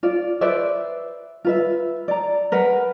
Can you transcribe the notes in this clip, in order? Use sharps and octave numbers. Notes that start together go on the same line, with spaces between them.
F4 D5
B4 C5 D5 E5
F4 B4 E5
D5 A#5
A#4 B4 F#5